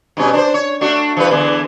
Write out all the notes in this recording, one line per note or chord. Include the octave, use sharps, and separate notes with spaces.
G2 B2 C#4
D4 A#4 C5
C#5
A3 D4 F#4
E3 G3 B4
E2 D3 E3